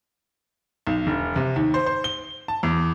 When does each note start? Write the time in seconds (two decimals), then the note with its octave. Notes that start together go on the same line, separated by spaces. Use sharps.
0.87 B1
1.07 E1
1.36 C3
1.56 D#2
1.74 C5
1.86 C5
2.04 G7
2.48 A5
2.63 E2